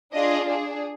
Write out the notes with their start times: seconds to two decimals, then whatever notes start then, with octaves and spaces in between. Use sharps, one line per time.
0.13 D4 F4 G#4 D#5
0.47 D4 G#4